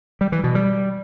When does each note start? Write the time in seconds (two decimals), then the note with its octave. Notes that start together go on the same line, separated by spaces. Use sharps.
0.21 G3
0.32 E3
0.44 B2
0.55 G3